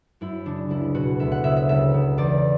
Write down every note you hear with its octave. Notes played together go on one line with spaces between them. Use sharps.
F#2 E4
C#3 D4
C#2 E4
B2 F#4
D2 E5
F#5
C#3 E5
E5
C#2 E5
C#3
E2 D5